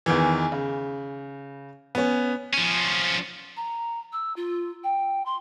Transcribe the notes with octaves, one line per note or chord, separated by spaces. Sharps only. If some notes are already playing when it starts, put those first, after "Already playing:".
E2 D#3 E3
C#3
B3 C#4
F3 C#4
A#5
E6
F4
G5
C6